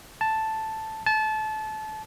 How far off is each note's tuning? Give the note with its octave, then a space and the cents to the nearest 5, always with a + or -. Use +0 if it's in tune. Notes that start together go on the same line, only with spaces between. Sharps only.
A5 +0
A5 -25